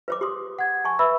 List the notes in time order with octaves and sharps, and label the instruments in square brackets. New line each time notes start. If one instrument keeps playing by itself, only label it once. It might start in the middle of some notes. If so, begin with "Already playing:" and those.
[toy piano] B4 C5 D6
G4 C6 D#6
[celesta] F#5 G#6
[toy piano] G#5 A5 C#6
[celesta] B4 E5 E6 [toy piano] B5